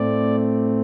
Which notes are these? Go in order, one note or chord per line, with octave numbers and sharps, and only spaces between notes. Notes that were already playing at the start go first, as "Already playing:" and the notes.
Already playing: A2 A3 C4 D5